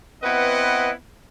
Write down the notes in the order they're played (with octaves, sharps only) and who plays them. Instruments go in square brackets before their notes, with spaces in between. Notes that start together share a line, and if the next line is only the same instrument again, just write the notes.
[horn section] B3 C4 E4 B4 D#5 F#5